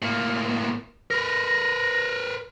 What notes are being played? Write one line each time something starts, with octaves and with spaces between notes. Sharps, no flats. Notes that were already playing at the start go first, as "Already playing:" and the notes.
A2 A#3
A#4 B4 A#6